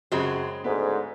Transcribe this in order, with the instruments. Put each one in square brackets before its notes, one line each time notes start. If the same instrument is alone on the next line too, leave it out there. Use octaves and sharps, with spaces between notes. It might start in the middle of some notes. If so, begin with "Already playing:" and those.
[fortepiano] F#2 F#4 G#4 [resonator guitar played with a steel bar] C#3 G#3 C4
[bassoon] D2 [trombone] G#2 [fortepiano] B3